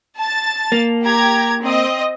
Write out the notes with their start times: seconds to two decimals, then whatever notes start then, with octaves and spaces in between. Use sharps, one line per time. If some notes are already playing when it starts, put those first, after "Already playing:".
0.18 A5 A6
0.72 A#3
1.03 G4 A#5 G#6
1.62 C4 D#5